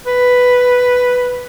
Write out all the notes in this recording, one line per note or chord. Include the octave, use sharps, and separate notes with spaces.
B4